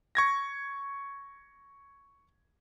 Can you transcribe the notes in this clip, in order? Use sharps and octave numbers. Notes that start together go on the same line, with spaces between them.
C#6 G#6 A#6